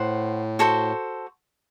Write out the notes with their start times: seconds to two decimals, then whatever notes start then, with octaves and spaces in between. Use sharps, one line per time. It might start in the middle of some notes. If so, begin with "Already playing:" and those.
Already playing: A2 C5 F#5
0.59 F#4 A4 C5